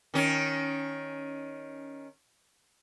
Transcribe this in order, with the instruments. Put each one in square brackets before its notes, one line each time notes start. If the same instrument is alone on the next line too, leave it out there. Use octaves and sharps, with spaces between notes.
[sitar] D#3 C#4